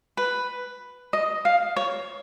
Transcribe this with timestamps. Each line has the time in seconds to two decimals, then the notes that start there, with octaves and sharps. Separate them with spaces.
0.17 B4
1.13 D#5
1.45 F5
1.76 C#5